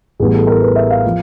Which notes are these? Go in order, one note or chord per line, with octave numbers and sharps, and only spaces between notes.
A1 A2 E3 G3 B3 G#4
A4
A#4
B4
E5
F5
F3